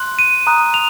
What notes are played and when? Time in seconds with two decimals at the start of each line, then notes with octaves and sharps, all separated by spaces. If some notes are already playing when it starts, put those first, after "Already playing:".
Already playing: C6 F#6
0.19 D#7
0.47 A#5 D#6 F#6
0.74 F7